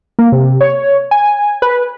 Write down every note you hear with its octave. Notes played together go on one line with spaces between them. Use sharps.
A#3
C3
C#5
G#5
B4